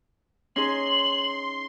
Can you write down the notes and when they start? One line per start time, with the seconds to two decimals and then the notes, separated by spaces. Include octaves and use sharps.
0.56 C#4 D#4 G#4 C6 F#7